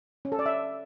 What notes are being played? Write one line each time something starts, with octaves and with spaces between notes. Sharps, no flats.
C#4
A4
D5
E5